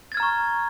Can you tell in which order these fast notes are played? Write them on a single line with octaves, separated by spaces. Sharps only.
A6 G#6 F6 A#5 C#6